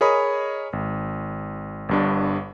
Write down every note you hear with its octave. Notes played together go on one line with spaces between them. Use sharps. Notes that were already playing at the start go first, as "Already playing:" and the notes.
G#4 A#4 C#5 D#5 B5 D#6
G#1
G1 G2 D4